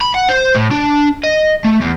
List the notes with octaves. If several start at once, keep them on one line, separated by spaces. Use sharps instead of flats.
B5
F#5
C5
A2
D4
D#5
A3
E2